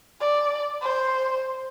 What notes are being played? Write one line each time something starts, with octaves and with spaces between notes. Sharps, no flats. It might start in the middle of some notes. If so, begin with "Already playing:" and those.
D5
C5